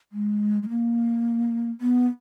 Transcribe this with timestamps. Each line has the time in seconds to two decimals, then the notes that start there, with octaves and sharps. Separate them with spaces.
0.12 G#3
0.63 G#3
0.69 A#3
1.81 B3